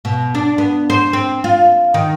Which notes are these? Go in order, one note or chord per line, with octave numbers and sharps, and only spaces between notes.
B2
D4
B3
C5
C4
F4
D#3